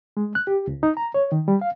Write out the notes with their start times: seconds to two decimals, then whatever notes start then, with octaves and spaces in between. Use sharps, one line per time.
0.17 G#3
0.35 F#6
0.47 G4
0.67 C#2
0.83 D#4
0.97 A#5
1.14 C#5
1.32 D#3
1.48 G3
1.61 F5